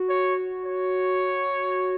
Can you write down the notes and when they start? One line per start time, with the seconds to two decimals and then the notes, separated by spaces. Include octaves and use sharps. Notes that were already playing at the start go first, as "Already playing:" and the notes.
Already playing: F#4
0.09 C#5
0.66 C#5